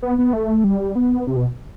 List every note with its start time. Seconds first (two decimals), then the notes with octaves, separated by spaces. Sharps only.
0.02 B3
0.18 B3
0.33 A3
0.64 G3
0.95 B3
1.27 C3
1.36 B2